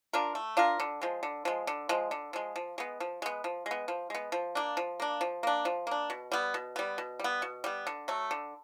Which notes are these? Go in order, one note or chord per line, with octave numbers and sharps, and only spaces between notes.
D4 F4 A#4
A3
D4 F4 A#4
D3
F3 G#3
D3
F3 G#3
D3
F3 G#3
D3
F3 G#3
F3
G#3 B3
F3
G#3 B3
F3
G#3
B3
F3
G#3 B3
F3
A#3 D4
F3
A#3 D4
F3
A#3 D4
F3
A#3 D4
B2
G3 B3
B2
G3 B3
B2
G3 B3
B2
G3 B3
D3
F#3 A3
D3